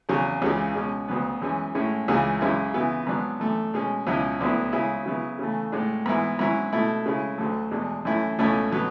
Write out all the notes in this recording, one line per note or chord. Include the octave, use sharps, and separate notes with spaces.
E2 C#3 F#3
C#2 C#3 E3 G#3
B2 G#3 C#4
D2 C#3 F#3 B3
F#2 E3 G#3 C#4
A2 G#3 C#4 E4
C#2 C#3 E3 G#3
F#2 C#3 G#3 C#4 E4
C#3 E3 B3 E4
G#2 F#3 B3 D4
F#2 E3 A3
B2 G#3 C#4
C#2 B2 F#3 C#4 E4
D2 D3 F#3 B3 E4
C#3 G#3 C#4 E4
C#3 F#3 B3 E4
C#3 E3 A3
A2 G#3 D4
G#2 E3 B3 E4
G#2 F#3 C#4 E4
B2 A3 E4
C#3 G#3 C#4 E4
D2 D3 F#3 A3
E2 B2 G#3 D4
F#2 E3 A3 C#4 E4
C#2 B2 A3 C#4 E4
B2 F#3 B3